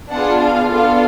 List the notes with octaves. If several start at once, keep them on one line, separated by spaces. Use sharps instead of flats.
B3 D4 F4 G#4 F#5
F5
B3 D4 F4 A4 F5